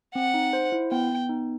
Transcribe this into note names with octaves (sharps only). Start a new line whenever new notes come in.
C4 F#5
D#4
C5
E4
B3 G5
B3
D#4